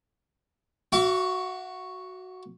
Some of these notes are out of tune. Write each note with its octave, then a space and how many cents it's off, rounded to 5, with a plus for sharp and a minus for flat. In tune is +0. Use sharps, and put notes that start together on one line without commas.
F#4 +0 E5 +45 D6 -45